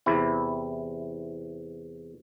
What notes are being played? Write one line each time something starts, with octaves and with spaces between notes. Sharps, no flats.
E2 C3 E4